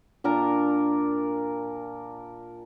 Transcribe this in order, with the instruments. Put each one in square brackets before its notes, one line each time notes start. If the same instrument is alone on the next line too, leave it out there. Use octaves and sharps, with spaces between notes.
[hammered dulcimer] A#2 D4 A#4 A#5